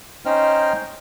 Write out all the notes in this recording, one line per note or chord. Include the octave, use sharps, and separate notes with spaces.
C#4 D#4 C5 D#5 G5 F6